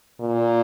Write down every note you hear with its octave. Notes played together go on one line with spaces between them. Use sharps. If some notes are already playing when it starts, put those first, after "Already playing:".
A#2